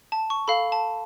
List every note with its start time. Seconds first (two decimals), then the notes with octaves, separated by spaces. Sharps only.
0.12 A5
0.30 C#6
0.48 A4 F5 B5
0.72 A5